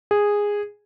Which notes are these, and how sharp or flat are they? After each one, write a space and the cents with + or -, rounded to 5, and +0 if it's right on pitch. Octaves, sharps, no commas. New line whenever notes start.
G#4 -10